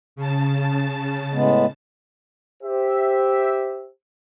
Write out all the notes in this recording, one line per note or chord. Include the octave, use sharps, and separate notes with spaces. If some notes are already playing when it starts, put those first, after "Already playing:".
C#3 A5
A2 G#3 B3
G4 C5 E5